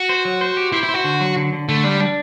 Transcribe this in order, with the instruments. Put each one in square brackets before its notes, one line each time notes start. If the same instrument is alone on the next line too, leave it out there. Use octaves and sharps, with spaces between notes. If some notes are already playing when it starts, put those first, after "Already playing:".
Already playing: [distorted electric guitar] F#4
[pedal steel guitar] C5
F#3
C5
G4
[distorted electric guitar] E4 [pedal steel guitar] C5
[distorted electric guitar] E4
[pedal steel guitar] C5
[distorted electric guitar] F#4
[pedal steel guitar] D3
F#3
D3
D3
[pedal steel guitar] D3 [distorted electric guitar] A3
[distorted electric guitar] G3 [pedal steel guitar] D4
[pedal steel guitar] D4